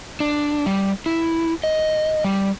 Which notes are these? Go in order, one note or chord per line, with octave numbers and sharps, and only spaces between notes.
D4
G3
E4
D#5
G3